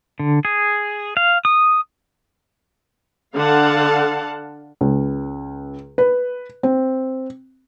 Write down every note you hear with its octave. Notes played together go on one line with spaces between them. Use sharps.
D3
G#4
F5
D#6
D3 F5 F#5 A5
C#2
B4
C4